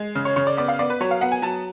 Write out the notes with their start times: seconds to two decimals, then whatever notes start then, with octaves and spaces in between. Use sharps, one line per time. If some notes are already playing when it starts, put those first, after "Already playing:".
Already playing: G#3
0.15 C#3
0.25 C#5
0.36 C#3 C#5
0.47 D5
0.57 B3 D5
0.68 F5
0.79 B3 D5
0.90 B4
1.00 F#3 C#5
1.11 F5
1.21 B3 F#5
1.32 G#5
1.42 F#3 A5